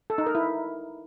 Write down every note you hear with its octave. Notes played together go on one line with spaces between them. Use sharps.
A4
D#4
A#4
E4